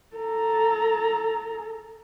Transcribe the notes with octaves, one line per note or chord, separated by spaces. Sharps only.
A4 A#5